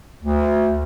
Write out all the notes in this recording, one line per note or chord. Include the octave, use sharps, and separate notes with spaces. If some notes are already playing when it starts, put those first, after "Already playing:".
D2